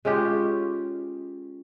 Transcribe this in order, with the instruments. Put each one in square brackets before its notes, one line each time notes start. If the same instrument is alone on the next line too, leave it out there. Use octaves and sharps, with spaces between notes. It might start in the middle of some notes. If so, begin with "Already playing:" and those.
[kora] G#3 C#4 F4 G4